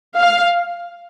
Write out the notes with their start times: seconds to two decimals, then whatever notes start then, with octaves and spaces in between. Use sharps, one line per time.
0.15 F5